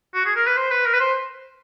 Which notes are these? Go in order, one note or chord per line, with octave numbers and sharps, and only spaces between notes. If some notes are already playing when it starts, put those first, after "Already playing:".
F#4
G#4
A#4
B4
C5
B4
A#4
B4
C5